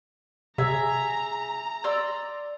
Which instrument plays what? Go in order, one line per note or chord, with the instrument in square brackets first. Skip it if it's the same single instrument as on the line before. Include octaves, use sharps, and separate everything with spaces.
[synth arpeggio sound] C3 [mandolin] G#4 E5 [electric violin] A#5
[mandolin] D5 C6 E6